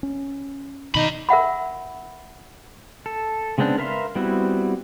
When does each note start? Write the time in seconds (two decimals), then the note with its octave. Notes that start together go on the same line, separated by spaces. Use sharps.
0.03 C#4
0.95 B2 D#3 D4 D#4 B5
1.29 A#4 E5 F#5 B5
3.06 A4
3.58 C#3 G#3 B3 C4 D4
3.78 A#4 B4 E5 F5 C6
4.16 G3 B3 C4 E4 F#4